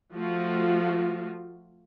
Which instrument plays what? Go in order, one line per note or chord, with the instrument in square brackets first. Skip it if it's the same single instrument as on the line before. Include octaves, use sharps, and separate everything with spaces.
[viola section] F3 A3 F4 F#4